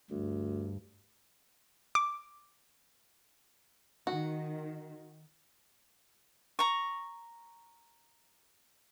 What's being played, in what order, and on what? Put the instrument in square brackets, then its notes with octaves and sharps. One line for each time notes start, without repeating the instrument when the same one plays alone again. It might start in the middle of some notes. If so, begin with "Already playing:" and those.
[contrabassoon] D2 [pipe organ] G2
[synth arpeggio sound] D6
[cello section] D#3 [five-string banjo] F#4
[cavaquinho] A#5 C#6